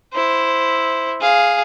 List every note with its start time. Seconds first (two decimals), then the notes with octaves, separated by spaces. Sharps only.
0.13 E4 C5
1.21 G#4 F5